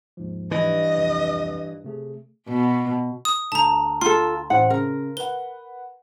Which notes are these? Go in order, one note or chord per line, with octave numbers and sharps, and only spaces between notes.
D#2 G#2 F3
G2 E3 D#5
C2 F2
C3 A3 G#4
B2
D#6
D2 A5 A#5
F4 A4 C6
A1 C5 F#5
C#3 A#4
B4 F#5 G7